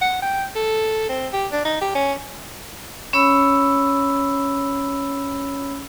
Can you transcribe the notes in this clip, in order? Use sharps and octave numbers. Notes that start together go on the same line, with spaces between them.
F#5
G5
A4
C4
G4
D4
D#4
G4
C#4
C#4 C#5 B5 E6